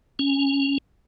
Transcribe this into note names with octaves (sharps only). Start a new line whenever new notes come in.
C#4